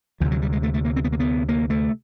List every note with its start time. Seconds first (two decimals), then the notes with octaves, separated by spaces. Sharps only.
0.20 D2 C3 F3
0.32 F#3
0.42 G3
0.52 G#3
0.63 A3
0.74 A3
0.85 A#3
0.96 C4
1.04 B3
1.12 A#3
1.20 B3
1.49 A#3
1.70 A3